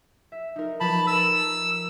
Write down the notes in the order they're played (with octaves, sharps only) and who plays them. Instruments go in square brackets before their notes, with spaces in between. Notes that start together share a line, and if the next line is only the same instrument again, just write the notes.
[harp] E5
D#4 A#4
[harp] F3 B4 [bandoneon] A5 B5
[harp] A#4 A6 [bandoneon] E6